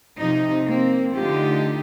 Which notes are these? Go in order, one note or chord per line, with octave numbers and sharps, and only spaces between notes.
C3 F3 D#4
A#3 C4
D3 A3 D#4 F4 G4